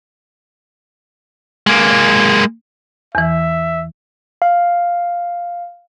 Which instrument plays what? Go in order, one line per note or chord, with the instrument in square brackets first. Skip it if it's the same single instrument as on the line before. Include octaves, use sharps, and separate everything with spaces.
[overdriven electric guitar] G#3 A#3
[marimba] E2 E3 [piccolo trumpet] E5
[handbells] F5